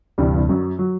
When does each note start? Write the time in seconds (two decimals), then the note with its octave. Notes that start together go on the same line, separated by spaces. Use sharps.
0.18 D2 G2 C3 E3 G3
0.49 F#2 F#3
0.79 F#3